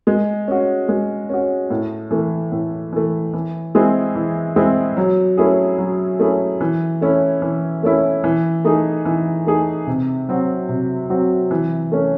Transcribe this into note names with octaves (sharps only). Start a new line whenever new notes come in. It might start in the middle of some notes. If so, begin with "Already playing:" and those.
G#3
C#4 F#4
G#3
C#4 F#4
A2
E3 A3
A2
E3 A3
E3
G#3 C4 E4 G#4
E3
G#3 C4 E4 G#4
F#3
A3 C#4 E4 G#4
F#3
A3 C#4 E4 G#4
E3
A3 C#4 E4
E3
A3 C#4 E4
E3
A3 D#4 G#4
E3
A3 D#4 G#4
C3
F#3 C4 F#4
C3
F#3 C4 F#4
E3
A3 C#4